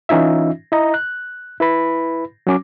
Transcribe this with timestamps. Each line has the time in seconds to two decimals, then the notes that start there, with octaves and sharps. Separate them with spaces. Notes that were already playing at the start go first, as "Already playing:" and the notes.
0.09 E3 C#4 D#4 F4 E5
0.72 E4 D#5 A#5
0.94 F#6
1.60 E4 B4 B5
2.47 F#3 C#4 D6